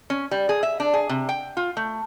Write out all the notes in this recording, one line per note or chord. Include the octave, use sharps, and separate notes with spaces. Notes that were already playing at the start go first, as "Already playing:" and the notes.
C#4
G3
G#4
E5
D4
G#4
C3
G5
F4
A3